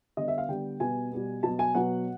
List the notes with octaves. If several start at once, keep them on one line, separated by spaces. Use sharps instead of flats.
D3 G3 B3 D#5
E5
F5
D3 G3 B3 G5
B2 G3 B3 G#5
B2 G3 B3
B2 F#3 B3 A5
G#5
B2 F#3 B3 F#5